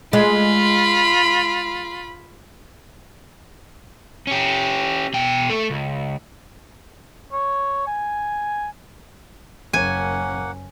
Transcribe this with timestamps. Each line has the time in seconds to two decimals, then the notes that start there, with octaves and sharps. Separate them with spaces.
0.13 G#3 F4 B5
4.27 C#4 G4
5.14 B2 G5
5.50 A3 A4
5.70 C#2
7.32 C#5
7.87 G#5
9.73 F#1 A#3 C#4 F#5 G#5